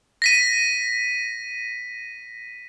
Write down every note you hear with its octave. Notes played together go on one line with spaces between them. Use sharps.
A#6 B6 D#7